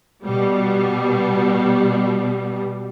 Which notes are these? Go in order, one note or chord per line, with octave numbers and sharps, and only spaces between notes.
B2 G3